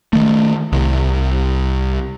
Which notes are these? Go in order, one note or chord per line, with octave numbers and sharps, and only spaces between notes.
D#3 A3
C2